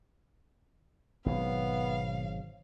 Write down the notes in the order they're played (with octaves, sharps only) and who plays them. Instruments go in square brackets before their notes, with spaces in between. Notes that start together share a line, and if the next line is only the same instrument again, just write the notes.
[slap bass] G#1 G#2 F#3 [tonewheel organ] B2 [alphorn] B3 [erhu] F5